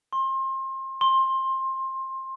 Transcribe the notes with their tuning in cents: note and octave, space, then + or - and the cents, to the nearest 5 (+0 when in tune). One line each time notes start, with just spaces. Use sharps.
C6 +30
C6 +20